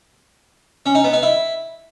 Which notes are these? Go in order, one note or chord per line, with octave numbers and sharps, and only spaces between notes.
C#4
D#4
B3
D#4
E4